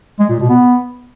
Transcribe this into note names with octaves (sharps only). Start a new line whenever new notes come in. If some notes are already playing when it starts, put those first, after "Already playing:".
G#3
A#2
B2
B3